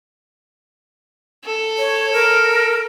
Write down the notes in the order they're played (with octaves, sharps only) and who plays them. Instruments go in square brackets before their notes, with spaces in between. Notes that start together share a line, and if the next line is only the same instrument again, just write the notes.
[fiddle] A4
[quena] C#5
A#4